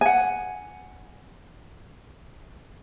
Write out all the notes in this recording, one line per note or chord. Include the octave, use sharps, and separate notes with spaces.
F#5 G#5